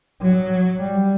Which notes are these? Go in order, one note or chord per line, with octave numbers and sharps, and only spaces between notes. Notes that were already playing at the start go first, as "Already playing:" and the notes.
F#3
G3